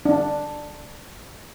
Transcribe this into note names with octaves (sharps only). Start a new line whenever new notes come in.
D4